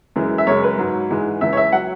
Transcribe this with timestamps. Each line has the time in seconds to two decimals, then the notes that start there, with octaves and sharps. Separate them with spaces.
0.16 F#2 E3 G#3
0.38 E5
0.47 F#2 C#3 G#3 C#5
0.64 B4
0.78 G#2 F#3
1.11 G#2 E3 G#3
1.41 C#2 C#3 E3 E5
1.53 C#5
1.57 E5
1.72 F#3 F#5